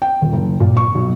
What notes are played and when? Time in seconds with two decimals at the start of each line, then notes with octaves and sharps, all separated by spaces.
0.02 G5
0.21 D#1
0.33 F#1
0.60 A#2
0.77 C#6
0.95 B1